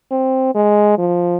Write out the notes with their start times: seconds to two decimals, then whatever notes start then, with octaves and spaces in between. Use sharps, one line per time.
0.11 C4
0.55 G#3
0.98 F3